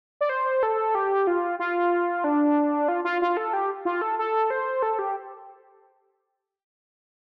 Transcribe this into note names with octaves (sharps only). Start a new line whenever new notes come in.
D5
C5
A4
G4
F4
F4
D4
F4
F4
F4
A4
G4
F4
A4
A4
C5
A4
G4